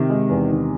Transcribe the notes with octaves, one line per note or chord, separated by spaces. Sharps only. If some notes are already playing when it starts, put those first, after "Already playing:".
Already playing: C3 D#3
G#3
E2
D#3